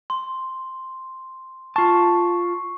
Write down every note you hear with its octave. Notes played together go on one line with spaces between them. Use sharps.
C6
F4 A5 C#6